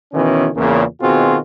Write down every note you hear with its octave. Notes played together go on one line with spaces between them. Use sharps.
B2 D#3 E3 C#4
E2 A#2 C#3
B2 D#3 C4 F4 F#4 G#4